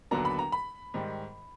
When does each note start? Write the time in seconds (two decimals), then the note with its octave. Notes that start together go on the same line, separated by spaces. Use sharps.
0.11 D#2 D3 F#3 B3 D4 A#5
0.25 B5
0.39 A#5
0.52 B5
0.94 G#2 D#3 G3